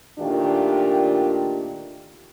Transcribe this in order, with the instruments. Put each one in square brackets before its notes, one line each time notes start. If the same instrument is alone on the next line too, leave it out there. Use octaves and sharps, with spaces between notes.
[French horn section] A#2 D#3 A3 D4 F4 G4